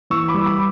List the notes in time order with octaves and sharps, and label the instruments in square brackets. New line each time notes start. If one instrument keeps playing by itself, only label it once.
[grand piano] E3 C#6 E6
B5 D6
G3
B5 D6